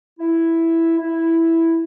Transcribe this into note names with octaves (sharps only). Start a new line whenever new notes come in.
E4
E4